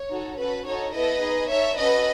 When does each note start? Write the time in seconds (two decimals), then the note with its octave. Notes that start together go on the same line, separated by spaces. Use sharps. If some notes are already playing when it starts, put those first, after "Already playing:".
Already playing: C#5
0.10 D#4 F#4 A4
0.37 C#4 F#4 A4 B4
0.66 D#4 F#4 A4 C#5
0.93 B3 E4 A4 B4 D#5
1.22 D#4 G#4
1.50 D#4 A4 C#5 E5
1.78 C#4 F#4 A4 B4 D#5